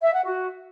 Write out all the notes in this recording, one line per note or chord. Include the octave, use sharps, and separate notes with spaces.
E5
F#5
F#4